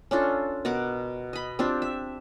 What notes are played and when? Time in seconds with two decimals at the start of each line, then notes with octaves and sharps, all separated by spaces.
0.11 C#4 D4 F4 A4
0.65 B2 A#4 F#5 D6
1.33 D#5 B5
1.59 C4 D4 F4 G4
1.82 E5